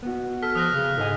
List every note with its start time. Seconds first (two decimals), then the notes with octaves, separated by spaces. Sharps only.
0.03 B3 F#4
0.43 A4 F6 B6
0.55 F3 D#6 F#6 A#6
0.71 C#3
0.97 G#2 A4 D#5 G#5